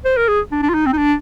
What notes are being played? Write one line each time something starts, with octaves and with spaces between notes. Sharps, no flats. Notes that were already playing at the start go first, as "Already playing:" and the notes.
C5
A#4
G#4
D4
D4
F4
D#4
C4
D#4
D4